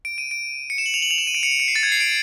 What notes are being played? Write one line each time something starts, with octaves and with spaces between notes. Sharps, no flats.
D7
D#7
D7
C#7
E7
F#7
F7
F#7
F7
E7
D#7
D7
C#7
D7
C#7
C7
A6
G#6
C7
D7